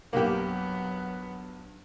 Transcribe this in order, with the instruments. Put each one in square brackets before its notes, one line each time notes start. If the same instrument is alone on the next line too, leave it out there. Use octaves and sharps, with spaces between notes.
[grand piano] B1 G2 [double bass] F#3 [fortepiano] A#3 G4 [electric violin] B3